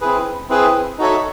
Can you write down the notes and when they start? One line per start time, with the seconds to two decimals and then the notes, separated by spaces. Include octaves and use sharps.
0.01 C4 E4 G#4 B4
0.49 C4 E4 G#4 B4
0.98 D#4 F#4 A4 C#5 E5